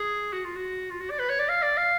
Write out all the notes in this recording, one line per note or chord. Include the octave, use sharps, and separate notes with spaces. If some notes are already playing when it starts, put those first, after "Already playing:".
Already playing: G#4
F#4
F4
F#4
F4
F#4
D5
B4
C#5
D5
F5
D5
F5